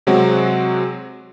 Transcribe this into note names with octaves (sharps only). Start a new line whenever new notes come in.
C3 F#3 G#3 C4 F#4